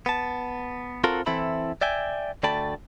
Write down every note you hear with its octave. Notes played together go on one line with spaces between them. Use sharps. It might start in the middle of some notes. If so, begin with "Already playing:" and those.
B3 A5
C4 F4 F#4 A4 A#4
E3 C4 E4 A4 E5 B5
D5 E5 G5 G#5
D2 A3 D5 G5 A5 B5